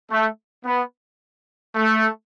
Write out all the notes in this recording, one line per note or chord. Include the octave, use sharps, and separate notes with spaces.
A3
B3
A3